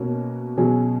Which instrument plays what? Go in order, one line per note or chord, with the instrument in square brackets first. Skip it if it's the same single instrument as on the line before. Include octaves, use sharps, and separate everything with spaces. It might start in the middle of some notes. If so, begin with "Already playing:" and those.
Already playing: [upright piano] B2 A#3 C#4 F#4
B2 F#3 C#4 G#4